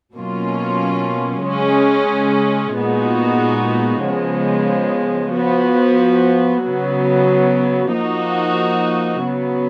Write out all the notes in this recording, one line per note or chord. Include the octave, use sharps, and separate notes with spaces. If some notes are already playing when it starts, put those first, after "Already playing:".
B2 F#3 A#3 C#4 F4
C#3 G#3 C#4
A#2 G#3 B3 D#4 F#4
C#3 F3 G#3 B3
F3 B3 F#4
C#3 F#3 B3
F3 A#3 D#4 F#4
C#3 F#3 B3